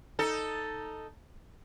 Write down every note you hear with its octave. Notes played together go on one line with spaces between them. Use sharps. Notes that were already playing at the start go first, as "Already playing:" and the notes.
D#4 A4